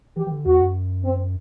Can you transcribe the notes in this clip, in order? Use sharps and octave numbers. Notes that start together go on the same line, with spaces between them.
E3 G4
E3
D3
E2 F#4
F#2
C4